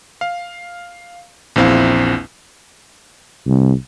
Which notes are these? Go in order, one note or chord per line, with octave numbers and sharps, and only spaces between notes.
F5
A#1 E2 C4 E4 F5
C2